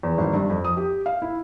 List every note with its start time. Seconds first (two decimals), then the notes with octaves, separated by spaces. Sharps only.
0.03 E2
0.18 G#1
0.34 G2
0.50 F2
0.65 D#6
0.77 G4
1.06 F5
1.22 E4